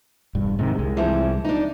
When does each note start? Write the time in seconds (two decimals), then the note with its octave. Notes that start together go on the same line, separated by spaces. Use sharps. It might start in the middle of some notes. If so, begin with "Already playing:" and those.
0.35 E1 G2
0.59 G#2 C3 D#3
0.76 C2 G#3
0.97 E3 F3 C4
1.45 D4 D#4